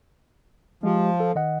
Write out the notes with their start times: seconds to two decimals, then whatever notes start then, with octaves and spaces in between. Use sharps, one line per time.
0.83 F3 G#3 G4
1.20 A4
1.35 D#3 D#5 F#5